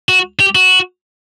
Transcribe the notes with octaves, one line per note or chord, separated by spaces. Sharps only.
F#4
G4
F#4